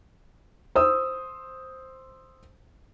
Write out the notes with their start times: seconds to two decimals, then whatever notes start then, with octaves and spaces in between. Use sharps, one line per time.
0.75 C5 D#6 E6